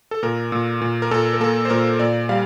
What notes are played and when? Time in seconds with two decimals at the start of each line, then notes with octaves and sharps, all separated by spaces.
0.11 A4
0.23 A#2 A#4
0.52 A#2
0.81 A#2
1.02 A#4
1.11 A#2 A4
1.33 A#4
1.40 A#3 A4
1.65 C5
1.70 A#2 A#4
1.99 A#2 D5
2.29 G3 F5